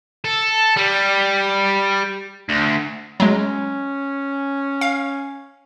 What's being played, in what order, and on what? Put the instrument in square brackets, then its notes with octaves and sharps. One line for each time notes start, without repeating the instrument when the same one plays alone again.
[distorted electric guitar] A4
G3
D2
[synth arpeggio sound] F#3 G#3 [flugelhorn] C#4
[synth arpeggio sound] F5